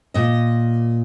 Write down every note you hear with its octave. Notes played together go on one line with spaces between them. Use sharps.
A#2 D#5